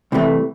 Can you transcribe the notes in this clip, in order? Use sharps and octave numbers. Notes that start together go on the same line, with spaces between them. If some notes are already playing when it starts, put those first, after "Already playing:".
C2 C3 E3 A3